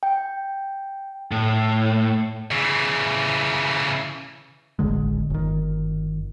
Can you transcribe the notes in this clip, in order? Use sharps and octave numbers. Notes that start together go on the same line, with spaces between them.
G5
A2
C#3 E3
E1 A1 D3 G#3
G1 D#3